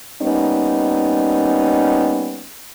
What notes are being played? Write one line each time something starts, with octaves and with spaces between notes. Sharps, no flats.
G3 A#3 B3 C#4 D#4